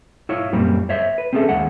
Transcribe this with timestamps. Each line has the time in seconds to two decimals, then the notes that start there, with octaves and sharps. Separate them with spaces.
0.29 E4 F4 C#5
0.53 F#2 A#2 G3 A#3 C4
0.89 C5 C#5 E5
1.18 B4
1.33 C4 C#4 G#4 A4 E5
1.49 D#2 G#3 F#5